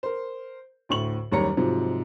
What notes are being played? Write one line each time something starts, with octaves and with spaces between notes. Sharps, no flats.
A#4 C5
D2 A2 C#6 F#7
F#1 D#2 G3 C#5 A#5 C#7
G#2 C3 F3 F#3